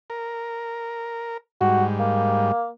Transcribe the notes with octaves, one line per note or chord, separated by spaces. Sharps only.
A#4
G#2 G3 F#4
A#3